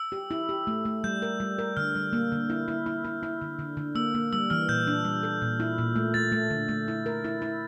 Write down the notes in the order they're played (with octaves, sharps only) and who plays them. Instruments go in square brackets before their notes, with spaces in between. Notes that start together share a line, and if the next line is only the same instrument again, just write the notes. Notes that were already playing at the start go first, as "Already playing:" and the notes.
Already playing: [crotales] E6
[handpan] G4
E4
G4
A3
A3
[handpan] G3 [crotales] G6
[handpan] A#4
G3
A#4
[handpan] D3 [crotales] F6
[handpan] G3
A#3
D3
E4
E4
E4
E4
E4
D3
D3
D3
[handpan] A#3 [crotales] E6
[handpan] A#3
[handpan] G3 [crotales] E6
[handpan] E3 [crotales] F6
[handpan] A#2 [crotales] G6
[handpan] D4
G3
A4
A#2
E4
A#2
A3
[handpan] A3 [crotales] A6
[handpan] A3
D3
A3
E4
A#4
E4
E4